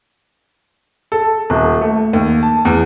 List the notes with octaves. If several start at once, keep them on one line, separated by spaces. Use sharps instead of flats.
A4
D#1
A3
D#2
A5
E2